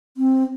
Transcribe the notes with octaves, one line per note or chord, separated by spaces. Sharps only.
C4